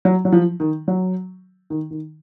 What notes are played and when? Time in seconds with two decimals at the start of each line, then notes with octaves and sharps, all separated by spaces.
0.05 F#3
0.25 F#3
0.32 F3
0.60 D#3
0.88 F#3
1.70 D#3
1.91 D#3